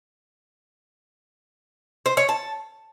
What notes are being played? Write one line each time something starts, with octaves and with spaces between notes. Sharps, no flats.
C5
C#5
A5